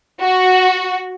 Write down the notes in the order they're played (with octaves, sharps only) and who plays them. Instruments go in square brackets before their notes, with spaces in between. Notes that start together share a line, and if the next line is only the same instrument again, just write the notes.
[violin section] F#4